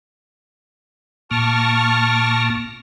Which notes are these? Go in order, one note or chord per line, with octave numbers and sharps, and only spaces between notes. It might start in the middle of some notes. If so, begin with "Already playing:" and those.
A#2 A#3 A5 C#6 F6